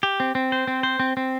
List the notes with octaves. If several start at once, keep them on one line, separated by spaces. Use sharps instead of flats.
G4
C4
C4
C5
C4
C5
C4
C4